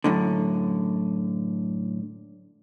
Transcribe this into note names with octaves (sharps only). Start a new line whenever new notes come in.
F#2 A2 D3